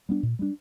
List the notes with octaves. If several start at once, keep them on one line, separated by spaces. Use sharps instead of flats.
G3 B3 D4
A#2
G3 B3 D4